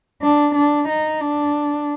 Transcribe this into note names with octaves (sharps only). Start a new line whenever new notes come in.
D4
D4
D#4
D4